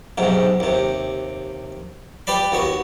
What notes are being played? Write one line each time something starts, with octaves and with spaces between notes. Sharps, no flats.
B1 G#2 C3
D#2 C3
G4 B4 D5 B5
D#2 B3 F#4